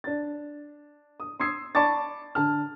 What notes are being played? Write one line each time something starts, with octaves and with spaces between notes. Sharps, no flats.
D4 A6
D#6
C6 D#6 E6 G#6 C7
D5 A5 B5 C#6 D6 A6
D3 A5 F6